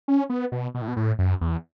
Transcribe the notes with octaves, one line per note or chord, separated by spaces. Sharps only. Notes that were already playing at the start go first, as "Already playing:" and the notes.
C#4
B3
B2
B2
A2
B2
A2
F#2
E2